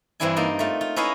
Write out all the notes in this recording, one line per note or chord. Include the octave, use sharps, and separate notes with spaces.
G2 E3 C4 D4 E4 G#5
A#3 D#4 D5
A3 F4
F4
C#4 E4 B4 D#5 F5 A#5